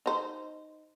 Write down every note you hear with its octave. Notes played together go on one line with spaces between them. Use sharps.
D#4 C5